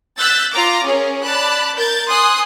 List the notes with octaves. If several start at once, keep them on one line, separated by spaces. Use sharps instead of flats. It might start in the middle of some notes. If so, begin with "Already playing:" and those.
E6 F#6 G6 A6 B6
F4 A#5 D6
C#4 G#4 A#4
D5 A5 B5 F#6
A#4 G6 A6
G#5 C6 D#6 F#6